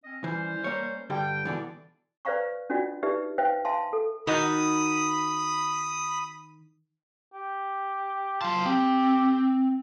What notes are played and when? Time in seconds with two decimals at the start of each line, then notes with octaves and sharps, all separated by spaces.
0.04 C4 C#4 D#5
0.24 E3 G3 C#4 C5
0.64 A#3 C#5
1.10 G2 D3 G3 G5
1.45 B2 D3 E3 D5
2.25 B4 C5 D5 F5 A#5 C#6
2.70 C#4 D4 F4 F#4 D5 D#5
3.03 D#4 G4 B4 D5 E5
3.38 B4 C5 E5 F5 G5
3.65 E5 F5 G#5 A5 C6
3.93 A4
4.27 D#3 D#4 F#4 B5 D#6
7.34 G4
8.42 F#3 F4 A5
8.66 C4 G4